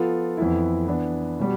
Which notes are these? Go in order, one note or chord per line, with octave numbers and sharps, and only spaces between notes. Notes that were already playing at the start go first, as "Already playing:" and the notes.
Already playing: F3 B3 F4 A4
F2 E3 B3 E4
E3 B3 D4
B2 G3